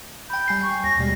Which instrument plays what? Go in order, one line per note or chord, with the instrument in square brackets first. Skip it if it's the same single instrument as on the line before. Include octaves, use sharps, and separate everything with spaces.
[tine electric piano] G5 B5 [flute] G6
[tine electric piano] G3 G#5 C7
[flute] C#6
[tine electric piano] D#2 [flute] A#6
[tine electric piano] B2 G3 G#3